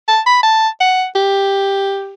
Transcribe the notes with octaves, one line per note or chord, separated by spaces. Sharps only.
A5
B5
A5
F#5
G4